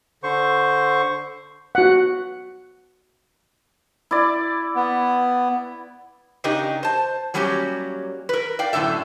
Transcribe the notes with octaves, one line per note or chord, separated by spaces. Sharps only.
D3 C5 C#6
F#4 F#5
E4 D5
B3
C#3 D4 D#4 G4 A#4 D#5
C5 A5
F#3 G3 A#3 C#4 G4
A#4 B4
D5 F5 G5
F#2 A2 D3 A4 E5